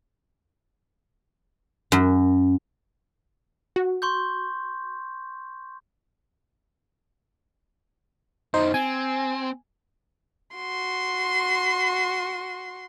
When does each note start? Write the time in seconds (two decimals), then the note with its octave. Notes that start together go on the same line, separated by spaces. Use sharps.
1.92 F#2
3.76 F#4
4.02 C6 C#6 G6
8.54 F#2 D#3 D#4 C5
8.74 C4 G#5
10.56 F#4 C6